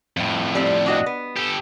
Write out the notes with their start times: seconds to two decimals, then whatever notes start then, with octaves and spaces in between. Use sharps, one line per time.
0.17 F2 A2
0.55 G3 C4
0.86 D4 F#4 D#5
1.06 B3
1.37 G4 A4